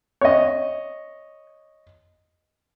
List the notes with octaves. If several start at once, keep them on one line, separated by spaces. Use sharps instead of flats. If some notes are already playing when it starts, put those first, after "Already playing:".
C#5 D#5